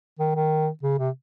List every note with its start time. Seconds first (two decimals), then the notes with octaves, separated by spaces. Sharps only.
0.19 D#3
0.36 D#3
0.83 C#3
0.99 C3